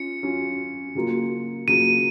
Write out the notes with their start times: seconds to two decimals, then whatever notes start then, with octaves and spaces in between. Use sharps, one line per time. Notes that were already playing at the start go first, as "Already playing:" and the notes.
Already playing: C#4 F4 C#7
0.23 F#3 C#4 F4
0.95 C#3 F#3 A#3 F4
1.68 C#3 F#3 A#3 F4 D#7